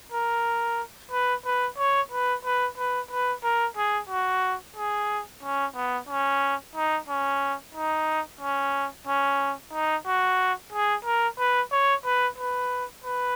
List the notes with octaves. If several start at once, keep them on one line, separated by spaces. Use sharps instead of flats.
A#4
B4
B4
C#5
B4
B4
B4
B4
A#4
G#4
F#4
G#4
C#4
B3
C#4
D#4
C#4
D#4
C#4
C#4
D#4
F#4
G#4
A#4
B4
C#5
B4
B4
B4